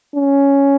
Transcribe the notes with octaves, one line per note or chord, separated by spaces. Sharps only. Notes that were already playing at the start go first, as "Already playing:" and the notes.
C#4